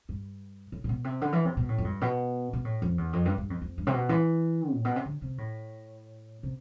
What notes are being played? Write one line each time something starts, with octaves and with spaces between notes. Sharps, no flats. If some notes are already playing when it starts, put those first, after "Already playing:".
G2
A2
A2
B2
C3
D3
E3
C3
B2
A2
F2
G2
B2
B2
A2
F2
E2
F2
G2
G2
F2
F2
G2
C3
B2
E3
A2
B2
C3
D3
C3
A2
C3